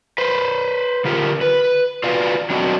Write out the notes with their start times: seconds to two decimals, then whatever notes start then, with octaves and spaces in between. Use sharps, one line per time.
0.18 B4 C5
1.05 D3 F4 G4 A#4
1.41 B4
2.04 F4 F#4 B4 D5 F5
2.50 F#3 C4 D4 F#4 D#5